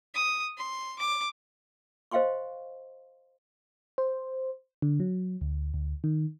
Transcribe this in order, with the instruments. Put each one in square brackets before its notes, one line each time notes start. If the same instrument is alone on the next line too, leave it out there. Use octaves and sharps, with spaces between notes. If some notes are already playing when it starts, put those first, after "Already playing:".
[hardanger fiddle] D#6
C6
D6
[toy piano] C5 D#5 F5 G5 C6 C#6
[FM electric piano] C5
D3
F#3
D2
D2
D#3